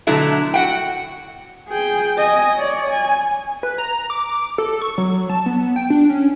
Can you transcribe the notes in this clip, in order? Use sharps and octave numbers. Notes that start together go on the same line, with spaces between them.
B2 D3 F#3 A3 E4
F#4 F#5 G5
G#4 G5
D#5 G#5
C#5 D5
G#5
B4
A#5
D6
D6
A4
C#6
F#3
A5
B3
G5
D4
C#4